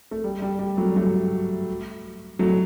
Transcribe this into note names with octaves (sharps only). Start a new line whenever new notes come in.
A3
G3
G3
G3
F#3 A3
F#3 A3
F#3 A3